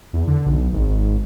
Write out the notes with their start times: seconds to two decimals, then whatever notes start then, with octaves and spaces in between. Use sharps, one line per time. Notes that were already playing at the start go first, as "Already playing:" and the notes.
0.13 E2
0.27 D3
0.46 B1
0.73 G#1